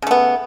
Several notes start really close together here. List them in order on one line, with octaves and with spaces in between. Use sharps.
C#3 A3 B3